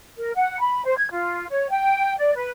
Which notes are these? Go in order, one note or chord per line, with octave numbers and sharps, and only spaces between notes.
A#4
F#5
B5
C5
G#6
F4
C#5
G5
D5
B4